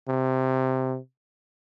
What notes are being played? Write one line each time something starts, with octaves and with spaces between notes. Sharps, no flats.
C3